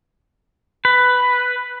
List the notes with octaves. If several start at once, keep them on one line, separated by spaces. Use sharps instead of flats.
B4